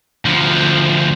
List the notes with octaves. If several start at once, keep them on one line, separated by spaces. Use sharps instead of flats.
D2 F3